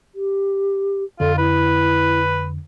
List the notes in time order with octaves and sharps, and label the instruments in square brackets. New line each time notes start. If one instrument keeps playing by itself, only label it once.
[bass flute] G4
[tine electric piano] F2 D3 [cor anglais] F4 [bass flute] A4
[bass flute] E4 [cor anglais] B4